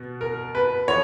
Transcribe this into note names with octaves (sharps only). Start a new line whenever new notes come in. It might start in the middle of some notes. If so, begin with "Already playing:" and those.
Already playing: B2 B3
A#4
B4
F3 C#5